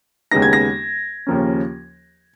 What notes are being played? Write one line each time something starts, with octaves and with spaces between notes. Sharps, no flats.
D#2 C#3 G#3 B3 D#4 A#6
G#6
A#6
D#2 C#3 F3 A#3 C#4